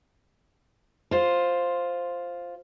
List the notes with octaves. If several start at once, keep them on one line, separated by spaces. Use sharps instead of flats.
F4 C5